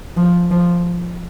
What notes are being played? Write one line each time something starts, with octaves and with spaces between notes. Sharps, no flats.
F3
F3